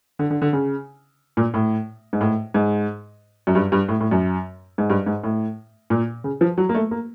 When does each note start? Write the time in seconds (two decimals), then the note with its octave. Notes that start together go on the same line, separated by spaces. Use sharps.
0.19 D3
0.30 D3
0.42 D3
0.53 C#3
1.37 A#2
1.54 A2
2.13 G#2
2.21 A2
2.54 G#2
3.47 F#2
3.55 G2
3.72 G2
3.89 A2
4.01 A2
4.11 F#2
4.78 G#2
4.90 G2
5.06 G#2
5.24 A2
5.90 A#2
6.24 C#3
6.41 F3
6.58 F#3
6.69 A#3
6.74 A3
6.91 A#3